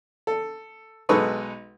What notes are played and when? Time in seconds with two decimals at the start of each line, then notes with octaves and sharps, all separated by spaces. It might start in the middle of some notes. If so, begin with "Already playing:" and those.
0.27 A4
1.09 B1 G#3 D#4 A4 B4 C#6